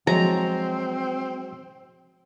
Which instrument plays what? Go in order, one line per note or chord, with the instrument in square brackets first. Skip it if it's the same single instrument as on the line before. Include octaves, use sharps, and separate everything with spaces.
[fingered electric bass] F3 [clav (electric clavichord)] F#3 G#3 [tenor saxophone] C4 [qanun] A#5